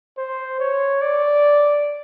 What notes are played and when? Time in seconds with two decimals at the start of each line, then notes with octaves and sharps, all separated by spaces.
0.18 C5
0.60 C#5
1.02 D5